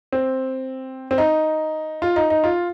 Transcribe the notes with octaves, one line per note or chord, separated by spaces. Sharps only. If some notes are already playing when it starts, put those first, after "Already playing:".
C4
C4
D#4
F4
D#4
D#4
F4